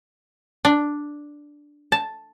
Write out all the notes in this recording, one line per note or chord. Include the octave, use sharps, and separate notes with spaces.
D4
A5